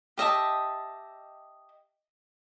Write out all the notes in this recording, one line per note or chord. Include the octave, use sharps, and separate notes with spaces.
G4 D#5 E5 A5